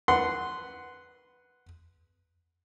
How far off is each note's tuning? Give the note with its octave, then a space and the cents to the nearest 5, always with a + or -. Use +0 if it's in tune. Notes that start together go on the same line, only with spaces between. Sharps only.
B4 +0 F#5 +0 C6 -15